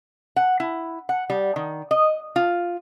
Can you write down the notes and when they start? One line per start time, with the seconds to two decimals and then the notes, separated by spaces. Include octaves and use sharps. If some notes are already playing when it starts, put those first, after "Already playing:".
0.36 F#5
0.60 E4
1.09 F#5
1.30 G3
1.56 D#3
1.91 D#5
2.36 F4